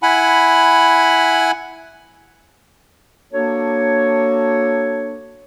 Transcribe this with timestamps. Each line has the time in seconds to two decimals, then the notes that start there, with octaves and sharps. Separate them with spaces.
0.03 E4 F#5 G#5 B5
3.32 A#3 D4 F#4 A4 C#5